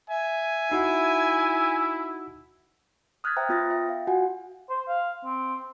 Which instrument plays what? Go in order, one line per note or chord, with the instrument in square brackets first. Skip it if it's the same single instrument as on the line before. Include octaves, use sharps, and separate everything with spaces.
[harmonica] E5 [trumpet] G#5
[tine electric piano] D#4 F#4 F#5 [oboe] E4
[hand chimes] D#6 F6 F#6 G#6 A6 B6
C5 E5 G5 A#5
B3 F4 D#6 A6 A#6
E5 G5
F5
F4 F#4 F#5 G#5
[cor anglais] C5
F5
C4